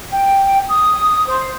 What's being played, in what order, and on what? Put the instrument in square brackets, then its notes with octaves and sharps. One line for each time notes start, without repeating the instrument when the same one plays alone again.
[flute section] G5
D#6
C5